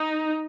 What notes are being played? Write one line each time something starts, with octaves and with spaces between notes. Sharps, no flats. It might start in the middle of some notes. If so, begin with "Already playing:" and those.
Already playing: D#4